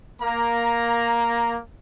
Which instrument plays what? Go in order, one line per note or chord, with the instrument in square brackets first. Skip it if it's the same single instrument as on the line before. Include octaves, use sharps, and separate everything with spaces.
[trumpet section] A#3 A#5